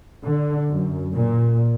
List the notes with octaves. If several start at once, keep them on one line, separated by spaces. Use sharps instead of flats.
D3
F#2
A#2